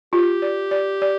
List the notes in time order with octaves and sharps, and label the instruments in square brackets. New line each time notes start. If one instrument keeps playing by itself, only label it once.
[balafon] F4 [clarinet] G4
[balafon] D5
D5
D5